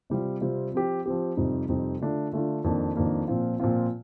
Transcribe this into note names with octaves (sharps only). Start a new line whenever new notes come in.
C3 G3 C4 F4
C3 G3 C4 F4
F3 C4 G4
F3 C4 G4
F2 C3 G3 C4 D#4
F2 C3 G3 C4 D#4
D3 A3 D4 F4
D3 A3 D4 F4
F2 D#3 A#3 D4
F2 D#3 A#3 D4
A#2 F3 C4 F4
A#2 F3 C4 F4